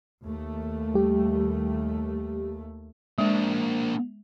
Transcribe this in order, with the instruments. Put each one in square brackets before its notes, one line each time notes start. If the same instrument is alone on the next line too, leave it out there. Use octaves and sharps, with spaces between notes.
[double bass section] D#2 A3
[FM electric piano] G3 G4
[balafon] G#3 [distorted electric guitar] A#3 D4